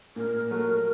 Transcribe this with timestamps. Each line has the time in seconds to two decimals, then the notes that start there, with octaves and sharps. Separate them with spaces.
0.16 A#2 A#4
0.51 F#3 A3